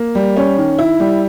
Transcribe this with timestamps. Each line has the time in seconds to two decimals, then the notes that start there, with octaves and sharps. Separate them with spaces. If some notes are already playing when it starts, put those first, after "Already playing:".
Already playing: A#3
0.15 G3
0.37 C#4
0.58 D#3
0.78 E4
1.00 G3